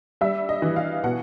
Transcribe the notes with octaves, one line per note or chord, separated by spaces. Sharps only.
G3 E5
D#5
E3
F5
B2 F#5